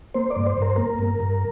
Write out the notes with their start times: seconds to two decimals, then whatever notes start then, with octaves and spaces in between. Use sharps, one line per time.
0.14 A#3 C5
0.30 D5
0.36 G2
0.46 C5
0.58 G2 A#4
0.70 C5
0.76 A#3 A#4
0.99 G2
1.20 G2